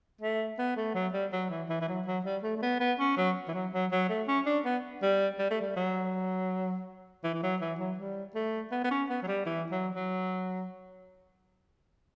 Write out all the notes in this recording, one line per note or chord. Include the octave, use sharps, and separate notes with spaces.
A3
B3
A3
F#3
G3
F#3
E3
E3
E3
F#3
F#3
G3
A3
A3
B3
B3
C#4
F#3
E3
F#3
F#3
F#3
A3
C#4
D4
B3
G3
G3
A3
G3
F#3
E3
E3
F#3
E3
F#3
G3
A3
B3
B3
C#4
B3
F#3
G3
E3
F#3
F#3